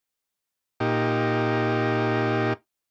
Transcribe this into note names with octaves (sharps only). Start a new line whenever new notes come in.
A#2 D#4 G4